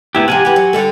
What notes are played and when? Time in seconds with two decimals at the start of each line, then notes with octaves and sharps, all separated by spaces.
0.15 D2 C3 B3 E4 G4
0.28 C3 F3 G4 F#5 G#5
0.45 E3 G4
0.56 F#3
0.73 D3 G3 A4